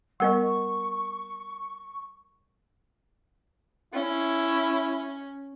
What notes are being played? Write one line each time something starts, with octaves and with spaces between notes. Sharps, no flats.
G3 B3 A#4 D#5 F#5 C#6
C#4 E4